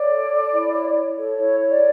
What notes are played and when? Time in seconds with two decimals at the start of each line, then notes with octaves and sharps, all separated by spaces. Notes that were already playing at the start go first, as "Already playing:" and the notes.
Already playing: C#5 D5
0.08 A4
0.30 A4
0.51 E4
0.74 C#5
0.95 C#5
1.16 A4
1.38 E4 C#5
1.60 C#5
1.71 D5